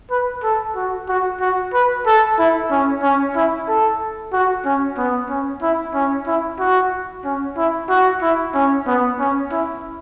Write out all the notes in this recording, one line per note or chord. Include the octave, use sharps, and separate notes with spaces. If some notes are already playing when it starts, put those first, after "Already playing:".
B4
A4
F#4
F#4
F#4
B4
A4
E4
C#4
C#4
E4
A4
F#4
C#4
B3
C#4
E4
C#4
E4
F#4
C#4
E4
F#4
E4
C#4
B3
C#4
E4